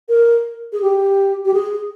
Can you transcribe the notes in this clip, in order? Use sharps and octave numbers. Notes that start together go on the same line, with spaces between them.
A#4
G#4
G4
G4
G#4